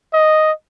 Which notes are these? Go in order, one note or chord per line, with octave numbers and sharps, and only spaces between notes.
D#5